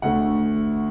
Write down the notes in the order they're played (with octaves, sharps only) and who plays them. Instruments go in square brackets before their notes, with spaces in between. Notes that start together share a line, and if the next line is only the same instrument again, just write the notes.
[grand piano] D2 D3 A3 F#5